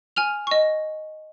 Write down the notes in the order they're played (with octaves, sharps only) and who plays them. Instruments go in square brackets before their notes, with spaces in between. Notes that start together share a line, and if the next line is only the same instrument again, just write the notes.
[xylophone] G#5 F6 F7
D#5 C#6